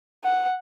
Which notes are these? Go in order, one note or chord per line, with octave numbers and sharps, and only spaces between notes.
F#5